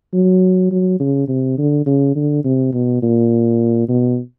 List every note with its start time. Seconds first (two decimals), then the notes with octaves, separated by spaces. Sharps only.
0.14 F#3
0.71 F#3
1.00 C#3
1.28 C3
1.58 D3
1.86 C#3
2.15 D3
2.44 C3
2.73 B2
3.02 A#2
3.89 B2